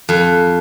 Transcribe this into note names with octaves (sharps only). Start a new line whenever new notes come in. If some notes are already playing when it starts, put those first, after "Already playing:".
F2